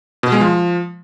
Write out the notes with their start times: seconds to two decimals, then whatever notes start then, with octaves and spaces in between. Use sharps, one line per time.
0.23 B2
0.32 G#3
0.41 F3